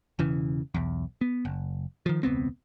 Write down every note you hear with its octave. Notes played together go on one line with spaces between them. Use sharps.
E1 C#3 E3
B1 E2
B3
F#1
D#3 F3
E1 C#2 B3 C4